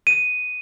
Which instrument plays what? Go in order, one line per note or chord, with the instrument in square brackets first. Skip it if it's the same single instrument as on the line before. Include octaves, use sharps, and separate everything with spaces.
[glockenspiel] D#7